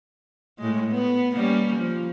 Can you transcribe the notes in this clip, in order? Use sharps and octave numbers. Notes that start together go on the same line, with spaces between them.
A2 G#3
B3
G3 A#3 C#4
F3